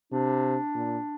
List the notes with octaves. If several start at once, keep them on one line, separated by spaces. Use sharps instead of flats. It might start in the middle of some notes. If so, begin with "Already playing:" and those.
C3 D4
A#2